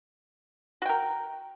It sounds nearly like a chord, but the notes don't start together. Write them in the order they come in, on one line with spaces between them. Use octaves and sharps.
F#4 G5 A#4